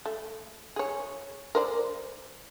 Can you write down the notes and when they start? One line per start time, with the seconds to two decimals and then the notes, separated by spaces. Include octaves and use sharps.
0.06 A3
0.76 G#4 C#5
1.55 A#4 C5 D5